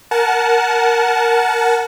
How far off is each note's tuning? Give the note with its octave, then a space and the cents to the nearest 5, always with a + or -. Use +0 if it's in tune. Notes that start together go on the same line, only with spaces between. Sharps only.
A#4 +0 F#5 +0 A5 -30